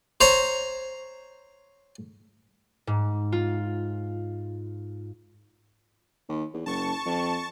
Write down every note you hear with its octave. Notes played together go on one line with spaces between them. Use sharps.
C5 C#5 A#5
G#2
F4
D#2
E2
F#1 A5 C#6
F2